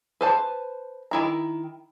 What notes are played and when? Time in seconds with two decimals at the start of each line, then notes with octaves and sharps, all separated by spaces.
0.21 B4 C5 A5
1.11 D#3 E4 A#5